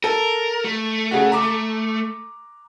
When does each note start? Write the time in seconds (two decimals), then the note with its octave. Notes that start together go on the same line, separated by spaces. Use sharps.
0.04 A4 A#4
0.64 A3
1.11 C#3 F#4
1.32 A#5 D6